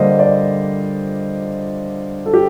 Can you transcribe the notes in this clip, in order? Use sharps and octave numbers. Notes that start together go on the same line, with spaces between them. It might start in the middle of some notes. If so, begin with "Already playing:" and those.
Already playing: D3 G3 A#3 C5 D5 D#5
D5
A4
G4